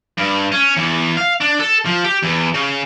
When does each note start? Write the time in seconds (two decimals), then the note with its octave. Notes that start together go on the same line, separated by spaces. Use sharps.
0.18 G2
0.52 C#4
0.77 E2
1.17 F5
1.41 D4
1.60 A4
1.86 F3
2.04 G4
2.23 E2
2.54 C#3